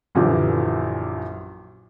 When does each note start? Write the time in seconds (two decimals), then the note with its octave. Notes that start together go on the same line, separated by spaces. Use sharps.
0.15 A#1 F#2 A#2 D3 E3 G4